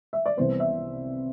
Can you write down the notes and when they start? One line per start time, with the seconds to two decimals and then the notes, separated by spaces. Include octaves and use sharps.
0.13 E5
0.26 D5
0.37 C2 C3 E3 B3 C5
0.60 E5